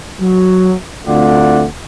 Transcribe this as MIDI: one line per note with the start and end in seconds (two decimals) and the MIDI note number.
0.21 0.73 54
1.07 1.64 38
1.07 1.64 57
1.07 1.64 60
1.07 1.64 65
1.07 1.64 74
1.07 1.64 78